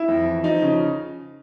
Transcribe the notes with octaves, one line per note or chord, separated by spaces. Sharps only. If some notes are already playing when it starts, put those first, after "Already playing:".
Already playing: E4
F2
E3
F3 D#4
C#3